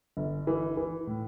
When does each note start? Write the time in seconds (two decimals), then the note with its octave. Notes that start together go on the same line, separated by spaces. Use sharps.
0.17 G1
0.47 E3
0.77 E3
1.07 A2